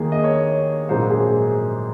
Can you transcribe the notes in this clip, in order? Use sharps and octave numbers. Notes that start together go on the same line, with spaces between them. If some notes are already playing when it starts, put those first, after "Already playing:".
Already playing: D#2 D#3 A#3 G#4
D#5
C#5
A#1 G#2 F#3 A#3 C5
G#4